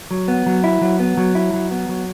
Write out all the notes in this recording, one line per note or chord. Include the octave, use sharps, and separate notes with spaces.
F#3
B3
F#3
E4
F#3
B3
F#3
E4
F#3
B3
F#3